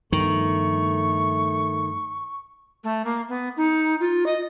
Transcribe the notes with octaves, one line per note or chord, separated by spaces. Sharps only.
G2 D#3 F3 A3 B3 C#6
A3
A#3
B3
D#4
F4
D#5